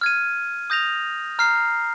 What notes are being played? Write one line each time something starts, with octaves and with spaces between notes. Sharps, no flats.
F6 G#6 D#7
D#6 G6 A#6 F7
A#5 F6 C7